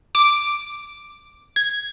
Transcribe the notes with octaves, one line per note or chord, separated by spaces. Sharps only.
D6
G#6